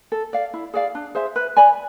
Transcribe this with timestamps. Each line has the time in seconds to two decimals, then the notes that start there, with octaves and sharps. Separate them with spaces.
0.12 A4
0.33 D5 F5
0.54 E4
0.74 G#4 D5 F5
0.95 D4
1.15 G#4 C5 E5
1.36 B4
1.56 D5 G#5 B5